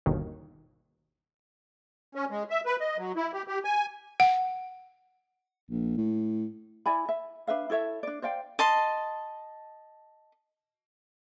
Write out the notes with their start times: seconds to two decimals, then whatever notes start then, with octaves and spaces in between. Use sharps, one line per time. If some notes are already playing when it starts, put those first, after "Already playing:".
0.06 G1 D#2 B2 D#3
2.15 C#4
2.30 G#3
2.50 E5
2.66 B4
2.80 D#5
2.98 F#3
3.16 E4
3.33 G4
3.47 G4
3.64 G#5
4.20 F#5
5.71 A#1
5.97 A2
6.86 E4 D5 G#5 B5
7.09 E5
7.47 D4 B4 E5 F5
7.70 E4 A4 C#5 E5
8.03 D4 D5
8.22 C5 D5 F5 G5
8.59 D#5 A5 C6